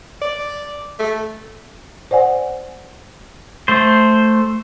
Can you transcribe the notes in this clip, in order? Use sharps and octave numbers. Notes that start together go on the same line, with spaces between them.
D5
A3
C5 D5 F#5 G#5
A3 C5